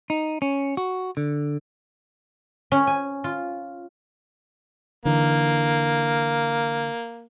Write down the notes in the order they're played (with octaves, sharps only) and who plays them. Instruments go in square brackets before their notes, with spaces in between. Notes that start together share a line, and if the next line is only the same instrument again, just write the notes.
[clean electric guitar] D#4
C#4
F#4
D3
[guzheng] C#4
G#5
F4
[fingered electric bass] D3 E3 [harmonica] A#3